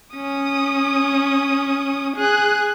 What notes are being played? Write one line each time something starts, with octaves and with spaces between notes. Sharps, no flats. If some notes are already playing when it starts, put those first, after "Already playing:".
C#4 D#6
G#4 F#6